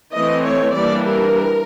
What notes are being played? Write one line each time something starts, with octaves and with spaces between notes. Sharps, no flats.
E3 A3 C4 D#5
C#5
E3 G3 A#3 D4 D5
A#4